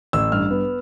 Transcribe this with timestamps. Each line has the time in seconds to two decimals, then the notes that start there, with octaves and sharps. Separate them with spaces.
0.13 A1 E6
0.32 G2 F6
0.51 B3